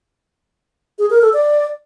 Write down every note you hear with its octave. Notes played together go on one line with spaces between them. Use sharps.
G#4
A#4
A4
D5